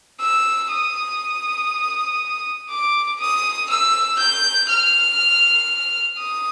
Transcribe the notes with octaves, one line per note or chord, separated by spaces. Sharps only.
E6
D#6
D6
D#6
E6
G6
F6
D#6